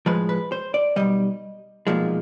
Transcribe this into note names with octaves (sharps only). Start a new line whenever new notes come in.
A2 F3 G#3 B4
B4
C5
D5
B1 A#2 G3 D#5
B1 A#2 F3 G#3